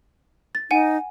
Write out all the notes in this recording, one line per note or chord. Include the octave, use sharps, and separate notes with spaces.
A6
D#4 F#5 G#5 D#7